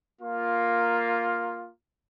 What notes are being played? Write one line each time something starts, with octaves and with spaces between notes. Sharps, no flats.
A#3 F4